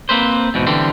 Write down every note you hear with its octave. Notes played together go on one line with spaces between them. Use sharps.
A#3 C4 B4 C5
E2 G#2 B2
D3 E3 G3 C4